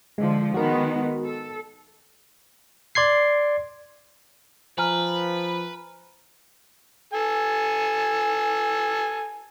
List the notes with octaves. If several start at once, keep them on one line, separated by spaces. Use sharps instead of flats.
D3 F3 G#3
D#3 G#3 B3 F#4 A#4
A4
D5 C6 G#6 C7
F3 B4 G#5 A#5 F6
A4 G#5